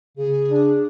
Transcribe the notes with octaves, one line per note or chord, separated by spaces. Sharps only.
C#3 G#4
D4